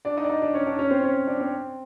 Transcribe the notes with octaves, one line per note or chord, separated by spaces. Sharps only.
D4 D5
D#4 D#5
D5
D#4 D#5
D4 D5
C#4 C#5
D4 D5
C#4 C#5
C4 C5
C#4 C#5
D4 D5
C4 C5